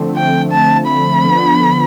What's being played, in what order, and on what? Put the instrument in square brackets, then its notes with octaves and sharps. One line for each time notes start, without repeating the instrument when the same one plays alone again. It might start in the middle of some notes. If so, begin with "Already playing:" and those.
Already playing: [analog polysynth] D3 F3 A3 C4
[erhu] G5
A5
B5
[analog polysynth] D3 F3 B3